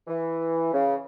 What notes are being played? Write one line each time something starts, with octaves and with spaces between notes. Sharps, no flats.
E3
C#3